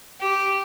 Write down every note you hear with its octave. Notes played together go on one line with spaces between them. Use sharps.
G4